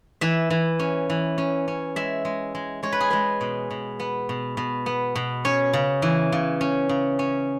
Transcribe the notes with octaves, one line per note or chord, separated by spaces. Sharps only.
E3 E5
E3
C#4
E3
C#4
C#4
G#3 E5
G#3
G#3
G#3 C#5
B4
G#4
G#3 B4
B2
B2
B3
B2
B2
B3
B2
C#4 C#5
C#3
E3
C#3
C#4
C#3
C#4